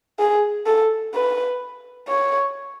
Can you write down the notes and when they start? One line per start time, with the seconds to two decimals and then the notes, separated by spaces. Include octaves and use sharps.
0.20 G#4
0.67 A4
1.14 B4
2.08 C#5